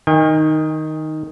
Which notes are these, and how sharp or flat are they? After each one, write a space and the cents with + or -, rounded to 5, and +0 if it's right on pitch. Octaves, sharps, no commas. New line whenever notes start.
D#3 +0 G5 +45